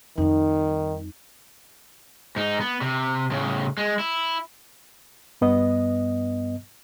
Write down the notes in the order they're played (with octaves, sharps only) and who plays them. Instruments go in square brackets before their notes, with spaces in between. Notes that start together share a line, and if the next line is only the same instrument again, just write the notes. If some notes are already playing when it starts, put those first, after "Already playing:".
[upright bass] F2 G3 [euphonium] D#3 [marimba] D#4
[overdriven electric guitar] G#2 D#4
B3
C3
A2 C#3
G#3
E4
[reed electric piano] G2 B3 D#5